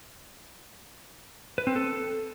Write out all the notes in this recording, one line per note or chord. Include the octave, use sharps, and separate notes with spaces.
B4
C4
A4